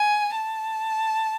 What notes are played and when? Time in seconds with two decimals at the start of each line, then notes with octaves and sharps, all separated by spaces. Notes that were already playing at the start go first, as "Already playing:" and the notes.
Already playing: G#5
0.35 A5